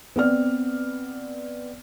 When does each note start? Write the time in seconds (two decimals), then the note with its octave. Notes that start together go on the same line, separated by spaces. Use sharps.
0.16 B3 C4 D5 F6